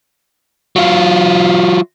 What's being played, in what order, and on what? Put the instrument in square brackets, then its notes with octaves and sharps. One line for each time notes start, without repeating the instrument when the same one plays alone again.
[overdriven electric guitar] F#3 F4